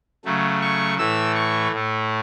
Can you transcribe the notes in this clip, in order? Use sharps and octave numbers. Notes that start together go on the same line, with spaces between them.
C#3 F#3 A3
C#6
A2 E3 A3 E6
C#6
A2 A3